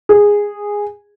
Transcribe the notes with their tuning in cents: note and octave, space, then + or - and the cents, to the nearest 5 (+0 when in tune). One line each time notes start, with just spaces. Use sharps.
G#4 -10